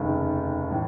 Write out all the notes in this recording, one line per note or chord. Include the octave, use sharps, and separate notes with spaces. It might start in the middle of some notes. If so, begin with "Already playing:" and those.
Already playing: F1 D#2 C#3
A2 E3